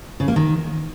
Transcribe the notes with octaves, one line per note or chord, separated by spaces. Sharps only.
C#3
A#3
D#3